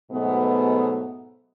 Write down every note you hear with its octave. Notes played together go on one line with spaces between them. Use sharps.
G#2 B2 F#3 A3 B3